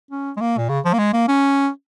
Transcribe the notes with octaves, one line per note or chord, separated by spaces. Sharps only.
C#4
G#3
A#3
A#2
C#3
F3
A#3
G#3
A#3
C#4